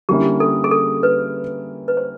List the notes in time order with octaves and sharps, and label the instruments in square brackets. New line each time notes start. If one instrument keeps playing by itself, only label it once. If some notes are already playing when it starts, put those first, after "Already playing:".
[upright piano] D3 G3 A#3 C#4 E4 [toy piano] G4
[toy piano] A4
G#4
A4
B4
B4
C5